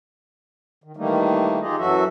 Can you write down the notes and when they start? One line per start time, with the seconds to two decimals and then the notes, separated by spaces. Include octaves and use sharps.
0.84 D#3
0.97 D#3 E3 G3 A3 A#3 D#4
1.60 D#4 F4 G4 G#4 D#5
1.78 F#2 E3 F#3 F#4 A4 E5